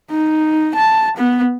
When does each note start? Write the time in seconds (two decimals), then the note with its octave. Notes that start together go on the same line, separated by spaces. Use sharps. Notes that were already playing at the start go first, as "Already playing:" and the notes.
0.10 D#4
0.76 A5
1.17 B3